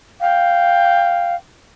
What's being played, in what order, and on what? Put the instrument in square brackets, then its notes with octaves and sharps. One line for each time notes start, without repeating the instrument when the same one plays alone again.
[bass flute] F5 [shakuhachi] G5